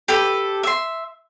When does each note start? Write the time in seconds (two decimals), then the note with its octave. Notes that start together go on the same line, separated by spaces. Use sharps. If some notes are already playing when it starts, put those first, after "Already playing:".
0.08 G4 A4 B4
0.63 E5 C6